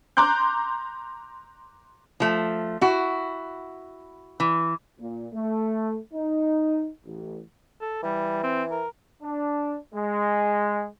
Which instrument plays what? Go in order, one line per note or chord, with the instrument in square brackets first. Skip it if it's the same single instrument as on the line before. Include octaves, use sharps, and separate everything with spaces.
[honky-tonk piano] A#5 C6 D6 F#6 G6
[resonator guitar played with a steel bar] F3 A3
E4 F#4
E3
[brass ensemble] A#2
A3
D#4
A1
[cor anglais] A4
[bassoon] E3 [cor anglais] G3
[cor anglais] C4
A#4
[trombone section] D4
G#3